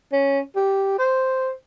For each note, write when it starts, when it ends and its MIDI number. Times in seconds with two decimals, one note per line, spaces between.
0.13 0.40 61
0.56 0.95 67
0.99 1.51 72